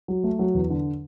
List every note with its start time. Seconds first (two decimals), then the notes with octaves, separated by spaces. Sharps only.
0.08 F#3
0.24 A3
0.39 F#3
0.54 E2
0.70 D3